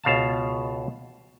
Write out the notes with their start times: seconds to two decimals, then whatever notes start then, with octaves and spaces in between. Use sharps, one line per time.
0.04 C#2 B2 F5 A5